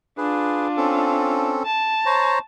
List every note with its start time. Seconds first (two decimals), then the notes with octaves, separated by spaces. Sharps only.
0.18 D4 F4 G#4 B4
0.77 C4 C#4 A4
1.65 A5
2.06 C5 C#5 A#5